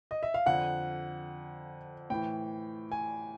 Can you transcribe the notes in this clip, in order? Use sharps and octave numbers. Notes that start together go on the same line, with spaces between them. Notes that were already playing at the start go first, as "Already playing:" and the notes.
D#5
E5
F5
F2 D3 F#5
A2 E3 G5
G#5